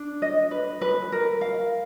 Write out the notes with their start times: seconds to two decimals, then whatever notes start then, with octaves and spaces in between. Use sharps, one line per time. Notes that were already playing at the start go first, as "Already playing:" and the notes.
Already playing: D4
0.22 D#5
0.51 B4
0.81 B4
1.12 A#4
1.41 F5